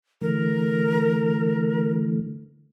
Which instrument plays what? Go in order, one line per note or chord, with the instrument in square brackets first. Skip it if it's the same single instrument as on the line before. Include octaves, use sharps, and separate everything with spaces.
[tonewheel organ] D3 E3 A3 [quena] A#4